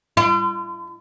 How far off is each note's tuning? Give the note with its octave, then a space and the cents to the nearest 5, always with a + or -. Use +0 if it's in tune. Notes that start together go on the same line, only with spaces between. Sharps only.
F4 -45